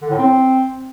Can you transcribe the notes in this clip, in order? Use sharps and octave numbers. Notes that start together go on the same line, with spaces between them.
D3
A2
C4